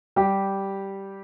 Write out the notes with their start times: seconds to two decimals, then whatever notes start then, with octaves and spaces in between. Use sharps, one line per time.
0.16 G3 G4